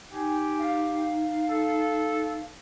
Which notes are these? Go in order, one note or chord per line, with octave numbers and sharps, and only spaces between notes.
D#4 G4 G#5
F5
A4